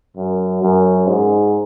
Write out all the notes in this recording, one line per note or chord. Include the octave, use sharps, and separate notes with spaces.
F#2
F#2
G#2